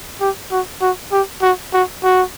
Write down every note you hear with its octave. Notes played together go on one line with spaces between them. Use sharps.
G4
F#4
F#4
G4
F#4
F#4
F#4